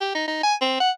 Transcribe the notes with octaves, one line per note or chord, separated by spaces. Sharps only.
G4
D#4
D#4
G#5
C4
F#5